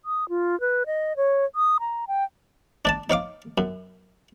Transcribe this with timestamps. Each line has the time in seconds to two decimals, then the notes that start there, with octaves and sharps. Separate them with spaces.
0.05 D#6
0.29 F4
0.60 B4
0.86 D#5
1.17 C#5
1.56 D#6
1.80 A#5
2.08 G5
2.85 D4 D5 A5
3.10 D#4 C#5 F5 D6
3.58 F#2